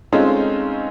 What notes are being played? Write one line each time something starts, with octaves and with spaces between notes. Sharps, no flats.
G#3 A3 C4 C#4 D#4 F4